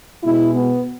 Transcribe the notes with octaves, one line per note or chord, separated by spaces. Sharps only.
B2 G#3 E4
B3